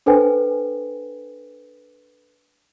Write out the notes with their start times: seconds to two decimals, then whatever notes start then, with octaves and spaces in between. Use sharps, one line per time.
0.06 D4 A4 B4 C5 G5 G#5